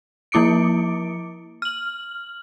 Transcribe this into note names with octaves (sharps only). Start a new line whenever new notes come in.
F3 A#3 E4 D6 C#7 D7
F6 F#7